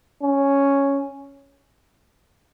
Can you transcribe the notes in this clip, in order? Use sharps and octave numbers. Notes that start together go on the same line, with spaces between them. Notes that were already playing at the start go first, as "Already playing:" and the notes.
C#4